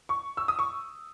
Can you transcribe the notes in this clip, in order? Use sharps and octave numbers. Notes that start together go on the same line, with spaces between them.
C#6
E6
D#6
C#6